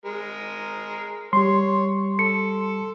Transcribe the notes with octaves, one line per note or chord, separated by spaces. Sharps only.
G#3 A#4
G3 G4 C#5 C6
A4 C#7